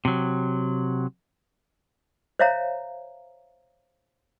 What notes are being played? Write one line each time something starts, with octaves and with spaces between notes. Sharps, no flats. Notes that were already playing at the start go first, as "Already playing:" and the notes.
C3 F#3
C5 C#5 E5 F5 A#5